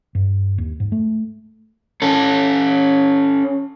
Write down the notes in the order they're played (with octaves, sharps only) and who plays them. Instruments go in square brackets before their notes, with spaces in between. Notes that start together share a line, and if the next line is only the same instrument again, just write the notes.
[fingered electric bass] G2
D#2
G#2
A3
[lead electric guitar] C#4 A4